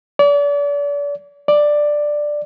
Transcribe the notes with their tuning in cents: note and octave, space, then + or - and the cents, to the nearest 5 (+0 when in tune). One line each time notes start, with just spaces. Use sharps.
D5 -40
D5 +5